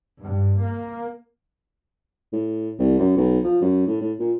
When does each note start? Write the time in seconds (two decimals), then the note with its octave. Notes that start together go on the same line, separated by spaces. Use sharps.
0.21 G2
0.61 A#3
2.33 A2
2.79 C2
2.99 F#2
3.17 B1
3.44 F3
3.62 F#2
3.87 A2
4.01 A2
4.19 A#2